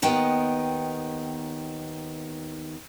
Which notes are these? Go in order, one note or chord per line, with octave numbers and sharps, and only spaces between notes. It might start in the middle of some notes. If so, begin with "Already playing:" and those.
D#2 D#3 B3 D#4 G5